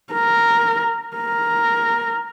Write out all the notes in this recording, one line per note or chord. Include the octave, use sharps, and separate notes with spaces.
A#4
A#4